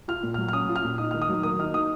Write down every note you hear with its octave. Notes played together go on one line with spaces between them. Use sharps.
F4 F6
A#2
F#3 F6
F6
C#4 D#6
F4
F6
A#2
D#4 D#6
D#3 F6
D#6
F#3
A#3 D#6
D#4 F6
D#3 D#6